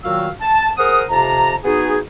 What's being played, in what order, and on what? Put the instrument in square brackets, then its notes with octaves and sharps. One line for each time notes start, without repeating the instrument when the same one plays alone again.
[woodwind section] A#2 D#3 F#3 F#4 F5 E6
A5
G#4 A#4 C5 F#5 D#6
F2 C3 A5 A#5
B3 D#4 F#4 G#4